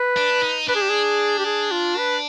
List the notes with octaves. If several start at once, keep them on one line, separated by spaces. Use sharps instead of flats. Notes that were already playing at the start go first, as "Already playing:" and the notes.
Already playing: B4
D4
D#4
D4 B4
G#4
G4
G#4
G4
G#4
F4
B4